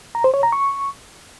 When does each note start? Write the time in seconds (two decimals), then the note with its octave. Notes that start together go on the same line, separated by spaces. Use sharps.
0.15 A#5
0.24 C5
0.34 C#5
0.43 A#5
0.52 C#6